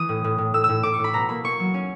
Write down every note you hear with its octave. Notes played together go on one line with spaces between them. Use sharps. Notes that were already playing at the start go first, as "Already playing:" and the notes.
Already playing: E3 D#6
A2
A2
A2
A2 E6
E6
A2
A2 D6
C#6
A2
B5
B2 A#5
A#3 B5
A#3 C#6
F#3
C#4